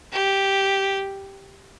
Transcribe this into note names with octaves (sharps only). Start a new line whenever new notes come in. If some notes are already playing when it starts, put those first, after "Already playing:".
G4